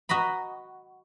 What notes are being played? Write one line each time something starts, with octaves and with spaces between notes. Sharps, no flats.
F#4 D#5 A#5 B5